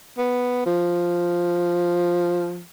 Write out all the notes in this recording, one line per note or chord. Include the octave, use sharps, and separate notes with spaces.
B3
F3